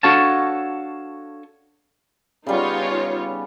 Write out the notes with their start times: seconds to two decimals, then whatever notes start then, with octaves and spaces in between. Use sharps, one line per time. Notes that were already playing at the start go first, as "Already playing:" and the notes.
0.03 D4 F#4 A4 C#5 F5 A5
2.46 C#3 G3 B3 D#4 F4 C#5